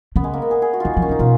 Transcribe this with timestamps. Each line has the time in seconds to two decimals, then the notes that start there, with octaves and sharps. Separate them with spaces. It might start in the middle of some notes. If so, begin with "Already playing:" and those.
0.16 C#3 B3
0.24 G#3
0.34 A#3
0.42 B3
0.51 G#4
0.62 G#4
0.73 F#4
0.80 D#3 D#4 F4
0.94 F3 A#3
1.02 C#4
1.09 C#3 D#4
1.19 B2 F4